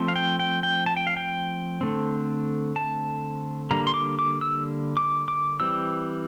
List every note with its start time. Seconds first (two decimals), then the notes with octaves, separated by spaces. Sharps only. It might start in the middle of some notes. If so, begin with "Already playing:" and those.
Already playing: F3 A3 C4
0.08 F5
0.16 G5
0.39 G5
0.63 G5
0.86 A5
0.96 G5
1.07 F5
1.17 G5
1.81 D3 A3 C4
2.76 A5
3.71 D3 G3 A#3 A#5
3.87 C6
3.94 D6
4.19 D6
4.41 E6
4.97 D6
5.28 D6
5.60 E3 G3 C4 E6